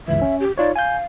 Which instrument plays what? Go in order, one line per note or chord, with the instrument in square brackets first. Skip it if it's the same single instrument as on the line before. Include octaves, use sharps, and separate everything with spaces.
[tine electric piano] G1 C#2 E3 [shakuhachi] E5
[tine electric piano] C#4
[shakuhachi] G4
[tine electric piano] D#4 F4 C#5 [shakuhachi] D5
[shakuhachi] F5 [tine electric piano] G#5 G6